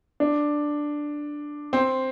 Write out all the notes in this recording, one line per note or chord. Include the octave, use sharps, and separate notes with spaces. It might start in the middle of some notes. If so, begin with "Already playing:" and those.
D4
C4